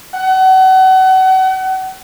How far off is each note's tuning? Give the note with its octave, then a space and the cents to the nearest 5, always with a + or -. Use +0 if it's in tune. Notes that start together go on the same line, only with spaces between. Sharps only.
F#5 +35